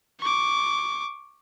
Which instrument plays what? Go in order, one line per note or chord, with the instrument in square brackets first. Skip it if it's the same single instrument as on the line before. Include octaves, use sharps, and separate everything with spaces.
[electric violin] C#6 D6